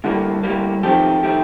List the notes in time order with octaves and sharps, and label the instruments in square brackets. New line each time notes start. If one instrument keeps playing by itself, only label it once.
[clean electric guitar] A2 G3 A#3 [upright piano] D3
[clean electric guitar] A2 G3 A#3
[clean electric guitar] C3 D#3 A3 C4 G4 [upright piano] F3
[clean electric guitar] C3 D#3 A3 C4 G4